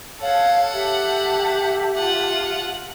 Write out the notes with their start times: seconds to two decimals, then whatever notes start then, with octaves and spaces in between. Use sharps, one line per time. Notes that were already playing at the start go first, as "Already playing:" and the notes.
0.21 A4 C#5 F5 F#5 A5
0.73 G4 E5 A5
1.95 F4 F#5